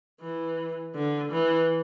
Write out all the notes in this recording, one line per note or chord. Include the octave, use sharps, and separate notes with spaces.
E3
D3
E3